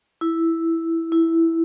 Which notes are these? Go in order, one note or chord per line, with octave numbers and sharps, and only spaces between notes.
E4
E4